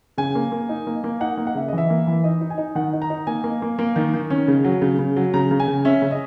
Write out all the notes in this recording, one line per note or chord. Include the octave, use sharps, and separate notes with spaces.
C#3 G#5
A#3
A#3
D#4
A#3
A#3
D#4 F#5
A#3
F#5
C#3 E5
E3 D#5
E5
A#3
E3
D#4 D#5
D#4
G#5
D#4
D#3 F#5
D#4
A#5
D#4
A#3 G#5
A#3
A#3
A#3
D#3
D#3
C#4
C#3
F#3
C#3
C#3
F#3
C#3 A#5
C#3
G#5
C#3
C#4 E5
C#3
D#5